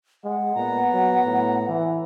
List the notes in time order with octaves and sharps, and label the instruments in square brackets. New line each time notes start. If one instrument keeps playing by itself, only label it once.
[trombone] G#3 [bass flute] F#5
[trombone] A#2 [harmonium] B3 A#5
[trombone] F#3
A2
E3